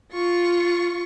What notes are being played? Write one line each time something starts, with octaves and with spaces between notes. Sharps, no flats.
F4 C#6